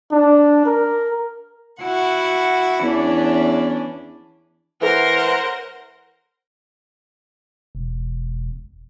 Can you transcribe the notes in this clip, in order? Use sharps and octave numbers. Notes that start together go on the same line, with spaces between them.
D4
A#4
E4 F#4 F#5
E2 E3 C#4 D4
E3 A#4 C5 F#5
E1